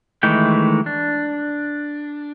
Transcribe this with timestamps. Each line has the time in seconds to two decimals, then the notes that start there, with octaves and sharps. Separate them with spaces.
0.23 D#3 E3 G#3 A3 G5
0.86 D4